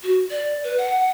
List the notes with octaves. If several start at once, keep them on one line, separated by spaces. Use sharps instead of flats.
F#4
D5
B4
F#5